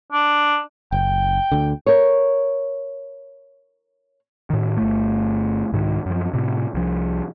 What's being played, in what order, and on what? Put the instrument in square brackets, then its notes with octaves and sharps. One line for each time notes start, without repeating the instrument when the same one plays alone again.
[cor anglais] D4
[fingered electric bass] F#1 [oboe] G5
[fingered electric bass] D2 D3
[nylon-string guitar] A#4 C#5
[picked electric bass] A2 D#3
G1 A3
C2 G#2 D#3
F#2 F3
A2 C3
C2 F3